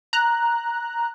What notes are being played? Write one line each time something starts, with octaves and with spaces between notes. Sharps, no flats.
A#5 F#6